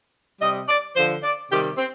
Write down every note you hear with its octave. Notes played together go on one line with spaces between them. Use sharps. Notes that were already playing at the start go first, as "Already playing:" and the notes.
C3 G3 D#5
D5
D3 F3 C5
D5
C3 D#3 G3 G4
C4